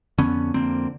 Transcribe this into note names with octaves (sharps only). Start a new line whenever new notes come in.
F2 D3 B3 C#4
F2 D3 A#3 C4